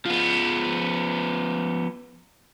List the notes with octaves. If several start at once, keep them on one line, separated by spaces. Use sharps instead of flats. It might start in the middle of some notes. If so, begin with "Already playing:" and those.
F3 B3